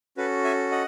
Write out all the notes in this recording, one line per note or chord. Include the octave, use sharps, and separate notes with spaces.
C#4 F#4 A4 B4
E5 G#5
D#5 F#5